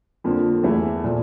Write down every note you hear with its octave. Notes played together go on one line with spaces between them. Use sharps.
F2 D3 F3 A#3
E2 E3 A3 E4
A#2 F3